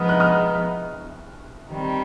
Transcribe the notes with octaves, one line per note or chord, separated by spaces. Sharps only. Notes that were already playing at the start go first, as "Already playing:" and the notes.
Already playing: F3 G#3 B3 D#4 D#6 F6
F#6
D#6 F6
D#3 G3 C4